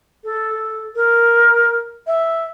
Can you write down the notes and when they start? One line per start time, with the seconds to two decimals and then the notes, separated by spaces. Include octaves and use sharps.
0.24 A4
0.95 A#4
2.06 E5